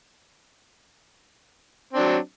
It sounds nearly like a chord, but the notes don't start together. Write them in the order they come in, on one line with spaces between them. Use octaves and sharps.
C4 D4 F#3